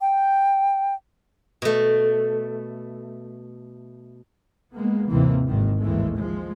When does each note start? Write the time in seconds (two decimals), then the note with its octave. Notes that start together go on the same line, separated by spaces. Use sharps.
0.01 G5
1.62 B2 A3
4.75 G#3 A#3 B3
5.09 D#2 G#2 C3 E3 A#3 C4
5.47 G#1 G#2 D#3
5.80 A1 D#2 D#3 E3 G#3 A3
6.16 F3 G#3